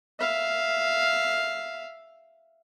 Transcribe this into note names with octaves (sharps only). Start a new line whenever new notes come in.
E5 F5